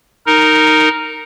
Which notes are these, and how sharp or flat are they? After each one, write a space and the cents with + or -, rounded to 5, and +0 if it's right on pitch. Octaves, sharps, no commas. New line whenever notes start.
D#4 +0 A#4 -10